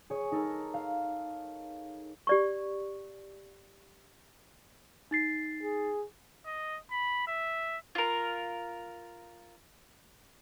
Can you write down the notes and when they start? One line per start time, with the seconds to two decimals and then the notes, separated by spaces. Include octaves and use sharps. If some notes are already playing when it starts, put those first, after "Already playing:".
0.10 G#4 C#5
0.32 D#4 A4 A#4
0.74 F5
2.27 G4 D5 C#6
5.11 D#4 A6 C7
5.63 G#4
6.46 D#5
6.91 B5
7.27 E5
7.95 F4 A#4